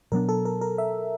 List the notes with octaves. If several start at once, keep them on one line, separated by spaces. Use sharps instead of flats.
B2 F#3 B3 D4 A#4
A4
A#4
A#4
E5